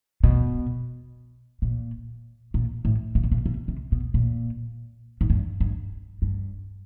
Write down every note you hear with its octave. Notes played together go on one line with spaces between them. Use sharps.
B2
A#2
A#2
A2
A#2
B2
A#2
B2
C3
B2
A#2
G#2
G2
G2
G2